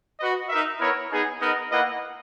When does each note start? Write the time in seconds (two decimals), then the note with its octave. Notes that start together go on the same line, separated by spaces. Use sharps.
0.19 F#4 B4 D#5
0.49 D#4 A#4 E5
0.79 B3 E4 A#4 C#5
1.10 B3 D#4 G#4
1.40 B3 D#4 A#4 D#5
1.71 A#3 E4 B4 D#5 F#5